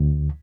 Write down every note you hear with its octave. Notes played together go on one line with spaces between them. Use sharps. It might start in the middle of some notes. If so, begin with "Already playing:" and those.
Already playing: D2